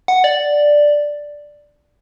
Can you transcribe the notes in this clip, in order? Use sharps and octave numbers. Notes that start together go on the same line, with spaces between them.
F#5
D5